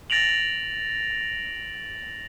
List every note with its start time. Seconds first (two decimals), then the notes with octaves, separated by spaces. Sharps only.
0.10 A6 A#6 D7 F7 F#7